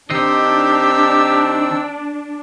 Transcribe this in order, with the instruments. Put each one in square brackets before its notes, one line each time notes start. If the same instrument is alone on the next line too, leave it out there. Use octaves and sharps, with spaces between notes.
[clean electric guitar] D#3 C5 D#5 [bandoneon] C4 D#4 E6 [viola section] D4 [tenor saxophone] G4